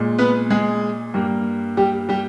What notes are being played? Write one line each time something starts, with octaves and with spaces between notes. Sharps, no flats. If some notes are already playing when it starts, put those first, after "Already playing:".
Already playing: A#2 G#3
B3 B4
G#3 G#4
G2 G3 A#3
G3 G4
G3 G4